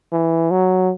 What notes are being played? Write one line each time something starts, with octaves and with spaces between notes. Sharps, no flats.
E3
F#3